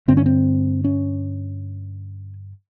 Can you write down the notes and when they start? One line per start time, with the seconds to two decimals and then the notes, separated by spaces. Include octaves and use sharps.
0.08 G2 D3 C4
0.17 C#4
0.26 C4
0.84 C#4